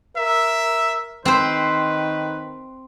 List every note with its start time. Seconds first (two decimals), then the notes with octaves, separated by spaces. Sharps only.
0.17 A#4 E5
1.25 D#3 C4 B4 C5